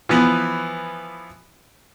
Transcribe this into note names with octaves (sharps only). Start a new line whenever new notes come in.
E3 F3 B3